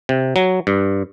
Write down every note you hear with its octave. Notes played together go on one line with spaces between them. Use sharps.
C3
F#3
G2